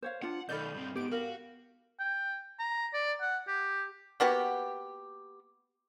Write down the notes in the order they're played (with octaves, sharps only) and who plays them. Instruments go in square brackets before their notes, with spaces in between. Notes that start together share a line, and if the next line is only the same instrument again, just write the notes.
[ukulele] C5 C#5 F5
[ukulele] D4 F4 [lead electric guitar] F#5
[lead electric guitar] B1 D#3 [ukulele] A4 D5 D#5 [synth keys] B5 F6 G6
[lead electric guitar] G2 C4
[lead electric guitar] G#2 [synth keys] B3 D7 [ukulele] G4
[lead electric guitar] F#4 [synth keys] G4 F5 [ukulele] A#4
[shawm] G5
A#5
D5
F#5
G4
[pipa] A#3 B3 F#4 G4